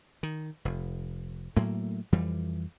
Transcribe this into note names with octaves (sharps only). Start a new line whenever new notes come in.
D#3
F1
A2 F#3 A3 A#3
F2 E3 G3